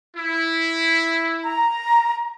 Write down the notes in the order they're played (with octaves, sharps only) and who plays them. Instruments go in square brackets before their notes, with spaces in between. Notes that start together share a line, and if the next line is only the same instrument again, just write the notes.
[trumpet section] E4
[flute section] A#5